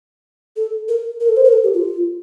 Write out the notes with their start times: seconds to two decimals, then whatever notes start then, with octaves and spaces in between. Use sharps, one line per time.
0.56 A4
0.88 A#4
1.20 A#4
1.29 A4
1.37 C5
1.44 A#4
1.53 A4
1.63 G4
1.74 F4